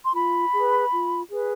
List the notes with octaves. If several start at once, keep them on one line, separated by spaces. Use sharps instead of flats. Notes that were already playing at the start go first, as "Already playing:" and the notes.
C6
F4 B5
G#4 B4
F4
G#4 B4